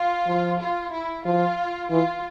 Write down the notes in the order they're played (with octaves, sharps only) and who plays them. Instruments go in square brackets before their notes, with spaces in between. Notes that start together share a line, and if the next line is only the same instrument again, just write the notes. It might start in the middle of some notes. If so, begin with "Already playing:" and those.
Already playing: [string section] F4
[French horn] F3
[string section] F4
E4
[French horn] F3 [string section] F4
[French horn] E3 [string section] F4